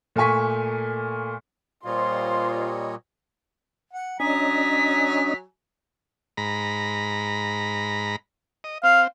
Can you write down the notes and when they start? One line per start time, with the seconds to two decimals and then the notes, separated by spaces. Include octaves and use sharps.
0.16 A#2 A3 A#3 G#5 C#6 B6
1.85 A#2 G3 F4 C5 C#5 D#5 C6
3.94 F#5
4.20 F#3 C#4 D4 D#5 G#5 A#5 B6
6.37 G#2 A#5 B5
8.64 D#5
8.83 C4 F5